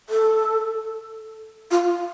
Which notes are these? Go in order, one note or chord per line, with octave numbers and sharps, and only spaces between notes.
A4
F4